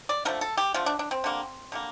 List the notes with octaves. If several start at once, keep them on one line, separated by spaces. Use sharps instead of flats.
D5
D3 F3 A3 A#4
A4
G4
D3 F3 A3 F4
D4
D4
C4
D3 G3 A#3
D3 G3 A#3